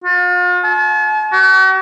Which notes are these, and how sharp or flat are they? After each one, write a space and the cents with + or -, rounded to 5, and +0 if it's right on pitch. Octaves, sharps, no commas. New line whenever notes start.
F4 +40
A5 -45
F#4 +45